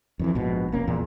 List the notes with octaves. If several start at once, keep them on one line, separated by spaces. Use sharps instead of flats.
F2 D#3 E3
A#1 G#2 B2
F1 A#3 C#4
E2 A#2